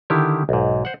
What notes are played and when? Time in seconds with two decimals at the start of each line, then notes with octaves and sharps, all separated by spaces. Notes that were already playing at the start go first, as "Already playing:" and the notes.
0.10 D3 D#3 E4 G4
0.49 B1 G#2
0.85 C5 F#5